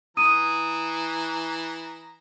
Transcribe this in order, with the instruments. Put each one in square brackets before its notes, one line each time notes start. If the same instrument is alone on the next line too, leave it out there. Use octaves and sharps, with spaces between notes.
[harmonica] E3 A#5 [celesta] D#6 D#7